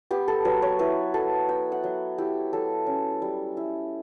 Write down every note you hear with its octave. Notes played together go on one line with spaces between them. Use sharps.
B3 G4
A4
F#3 B4
C#5
E4 B4
F#3 A4
B3 G5
F#5
F#3
E4 G4
F#3 A4
C#4
G3
E4